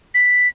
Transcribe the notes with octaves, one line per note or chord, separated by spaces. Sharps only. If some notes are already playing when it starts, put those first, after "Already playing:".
B6